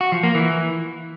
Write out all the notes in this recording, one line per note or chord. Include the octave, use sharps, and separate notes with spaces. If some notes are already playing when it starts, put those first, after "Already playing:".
F#4
F3
A#3
E3